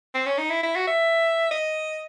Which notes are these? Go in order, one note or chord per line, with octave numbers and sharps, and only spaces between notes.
C4
C#4
D#4
E4
E4
F#4
E5
D#5